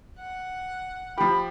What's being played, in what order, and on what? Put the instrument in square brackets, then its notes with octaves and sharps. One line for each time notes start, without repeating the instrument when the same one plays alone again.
[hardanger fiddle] F#5
[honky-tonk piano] F3 G4 [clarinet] B5